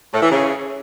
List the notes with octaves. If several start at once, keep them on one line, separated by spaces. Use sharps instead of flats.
A2
E3
C#3